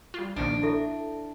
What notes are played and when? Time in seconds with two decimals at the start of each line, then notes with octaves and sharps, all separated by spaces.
0.14 G3 F4
0.36 A#1 D#3 A#3 D4
0.63 E4 A4 E5